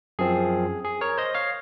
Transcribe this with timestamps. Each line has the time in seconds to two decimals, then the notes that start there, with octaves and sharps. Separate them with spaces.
0.19 F#2 F3 C4 G#4
0.85 G#4
1.01 A#4 C#5
1.18 C5 D#5
1.34 C#5 F5